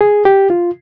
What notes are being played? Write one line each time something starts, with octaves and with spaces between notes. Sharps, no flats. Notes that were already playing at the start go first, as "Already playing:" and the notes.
G#4
G4
F4